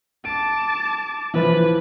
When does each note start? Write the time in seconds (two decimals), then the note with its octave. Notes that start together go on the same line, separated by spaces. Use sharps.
0.25 A5 D6 D7
1.34 E3 F3 B4